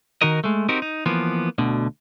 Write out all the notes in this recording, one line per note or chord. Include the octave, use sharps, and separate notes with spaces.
D#3 D#4 F#4 A#4 D#5
G#3 A3
C4 D#4 F#4 G4 A#4
D#4
E3 F3 A#3 B3
D2 B2 D3